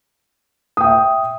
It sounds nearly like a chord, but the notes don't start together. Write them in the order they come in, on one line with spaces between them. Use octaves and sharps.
D#6 G5 E5